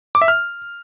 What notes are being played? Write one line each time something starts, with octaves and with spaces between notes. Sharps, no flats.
D6
E5
F6